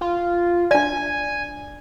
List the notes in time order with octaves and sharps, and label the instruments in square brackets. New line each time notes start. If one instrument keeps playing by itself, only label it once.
[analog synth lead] F4
[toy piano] D4 D5 [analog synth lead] G#5